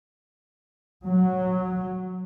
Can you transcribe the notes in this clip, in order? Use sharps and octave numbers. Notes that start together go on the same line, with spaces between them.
F#3